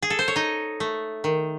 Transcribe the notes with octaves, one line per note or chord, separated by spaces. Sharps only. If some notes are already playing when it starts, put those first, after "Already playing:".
G#4
A4
C5
C#5
D#4 D#5
A3
D#3